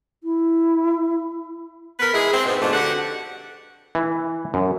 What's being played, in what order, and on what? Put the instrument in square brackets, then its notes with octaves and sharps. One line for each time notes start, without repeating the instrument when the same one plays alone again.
[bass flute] E4
[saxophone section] B3 A#4 B4
G#3 E4 G#4
C4
G#2 B2
F2 G#2 B2 A3 D4
D3 F#4 G4 F#5
[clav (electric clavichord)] E3
F#2